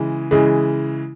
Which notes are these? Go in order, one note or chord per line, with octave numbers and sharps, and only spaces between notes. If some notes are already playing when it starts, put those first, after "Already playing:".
Already playing: C#3 E3 G#3
C#3 E3 G#3